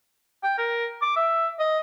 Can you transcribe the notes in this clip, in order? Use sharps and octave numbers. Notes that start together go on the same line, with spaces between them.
G5
A#4
D6
E5
D#5